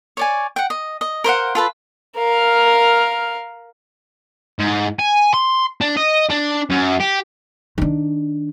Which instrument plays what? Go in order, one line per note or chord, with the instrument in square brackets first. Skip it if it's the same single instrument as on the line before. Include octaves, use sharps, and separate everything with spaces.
[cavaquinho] C#5 D5 G#5
F#5 G5
D#5
D#5
A#4 C5 F5 F#5
F4 A4 B4
[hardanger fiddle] A#4 F5
[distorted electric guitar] G#2
G#5
C6
D4
D#5
D4
F#2
G4
[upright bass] D#3 D4